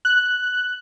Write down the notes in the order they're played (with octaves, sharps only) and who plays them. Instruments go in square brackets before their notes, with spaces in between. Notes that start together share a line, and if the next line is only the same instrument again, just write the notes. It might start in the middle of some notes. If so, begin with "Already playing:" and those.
[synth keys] F#6